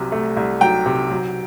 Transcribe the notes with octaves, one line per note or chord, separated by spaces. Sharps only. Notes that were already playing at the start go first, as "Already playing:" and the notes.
Already playing: C2 C3 F#3
A3
C2
F#3 G5 A#5
C3
F#3